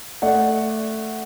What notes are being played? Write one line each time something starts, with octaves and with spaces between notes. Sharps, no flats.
A3 D5 F#5